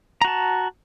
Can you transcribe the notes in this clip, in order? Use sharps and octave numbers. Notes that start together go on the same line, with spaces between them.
F#4 A5 A#5